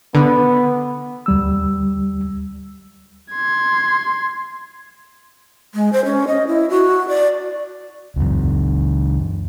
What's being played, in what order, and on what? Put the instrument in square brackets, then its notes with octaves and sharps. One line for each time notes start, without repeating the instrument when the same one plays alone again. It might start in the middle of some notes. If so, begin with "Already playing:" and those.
[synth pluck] D3 [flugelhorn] B3
[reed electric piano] D2 G3 E6
[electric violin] C6 G#6
[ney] G#3
C5
C#4
D#5
E4
F#4
D5
[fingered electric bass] C#2 F#2